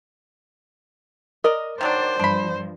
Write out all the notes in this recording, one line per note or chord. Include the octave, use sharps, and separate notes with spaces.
A#4 D5 D#5
D#3 F#3 D4 C5 D5
G2 F3 D4 B5